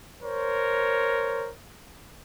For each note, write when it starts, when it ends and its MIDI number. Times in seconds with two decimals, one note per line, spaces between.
0.22 1.50 70
0.22 1.50 72
0.22 1.50 73